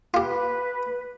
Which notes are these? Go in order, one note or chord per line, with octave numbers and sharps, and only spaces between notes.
F4 G4 B4